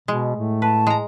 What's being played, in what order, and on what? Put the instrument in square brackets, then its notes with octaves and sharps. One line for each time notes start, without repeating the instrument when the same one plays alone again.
[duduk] B2 [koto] G#3
[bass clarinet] A2 [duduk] A3
[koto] B4 [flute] A5
[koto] G#3 A#5